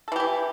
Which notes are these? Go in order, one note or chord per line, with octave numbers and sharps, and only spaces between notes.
E3 E4 G4 A4